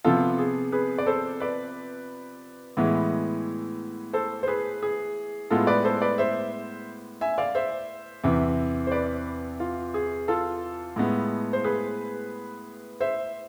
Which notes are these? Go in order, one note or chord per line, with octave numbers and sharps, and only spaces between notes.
C3 F3 B3 F4 A4
G#4
G#4 B4
D5
A4 C5
B4 D5
A2 E3 G#3 B3
A4 C5
C5
G#4 B4
G#4
A2 G#3 B3 F4 A4
B4 D5
A4 C5
B4 D5
C5 E5
E5 G#5
D5 F5
C5 E5
E2 C3 E3
C5
B4 D5
F4
G#4
F4 A4
A2 G#3 B3
C5
G#4 B4
C5 E5